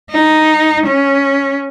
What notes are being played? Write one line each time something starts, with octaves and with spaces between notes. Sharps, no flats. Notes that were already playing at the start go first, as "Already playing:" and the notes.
D#4
C#4